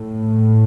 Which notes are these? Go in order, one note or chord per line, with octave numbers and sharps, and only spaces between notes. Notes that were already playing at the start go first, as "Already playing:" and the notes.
Already playing: A2